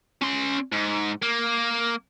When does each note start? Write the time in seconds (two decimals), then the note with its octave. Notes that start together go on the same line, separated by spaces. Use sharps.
0.22 C#4 C6
0.72 G#2
1.22 A#3